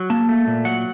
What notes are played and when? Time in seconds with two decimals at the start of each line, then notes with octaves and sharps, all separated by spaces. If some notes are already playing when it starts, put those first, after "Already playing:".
Already playing: F#3
0.10 A#3 A5
0.29 A3
0.47 A#2
0.65 F#3 F#5